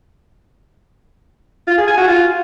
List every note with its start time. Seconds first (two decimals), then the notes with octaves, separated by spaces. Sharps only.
1.68 F4
1.78 G#4
1.88 G#5
1.98 F#4
2.08 F4